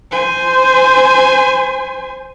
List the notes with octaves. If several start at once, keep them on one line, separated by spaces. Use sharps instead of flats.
C5 G#5